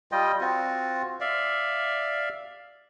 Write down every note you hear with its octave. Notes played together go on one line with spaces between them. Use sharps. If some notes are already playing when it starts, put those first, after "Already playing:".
G3 F4 D#5 G5
C4 F4 F#4
D5 E5 F5